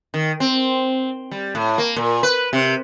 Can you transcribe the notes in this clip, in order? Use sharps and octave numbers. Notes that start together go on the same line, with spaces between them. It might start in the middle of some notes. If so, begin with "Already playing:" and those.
D#3
C4
G3
A2
A#3
A#2
B4
C3